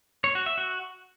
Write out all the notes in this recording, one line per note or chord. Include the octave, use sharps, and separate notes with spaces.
C#5
F#4
E5
F#4